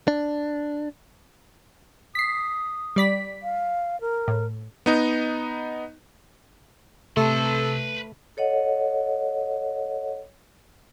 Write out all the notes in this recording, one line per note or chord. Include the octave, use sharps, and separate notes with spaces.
D4
D#6 B6 C7
G3 D5 B6
F5
A#4
A2
B3 D#4 D#5
C3 A3 A4 B4 C6
A4 C#5 D#5 F#5